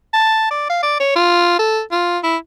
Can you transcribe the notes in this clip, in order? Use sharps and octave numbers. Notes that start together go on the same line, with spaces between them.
A5
D5
F5
D5
C#5
F4
A4
F4
E4